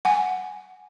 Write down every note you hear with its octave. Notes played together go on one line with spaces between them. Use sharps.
F#5 G#5